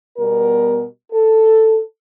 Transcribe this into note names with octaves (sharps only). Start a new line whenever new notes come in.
B2 G3 B3 A#4
A4